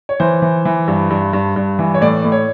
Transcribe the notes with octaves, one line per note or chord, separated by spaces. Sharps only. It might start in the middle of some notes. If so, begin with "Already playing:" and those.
C#5
E3 C5
E3
E3
G2
G2
G2
G2
E3
C#5
A2 D5
A2
C#5